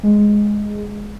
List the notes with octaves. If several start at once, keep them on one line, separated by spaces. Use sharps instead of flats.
G#3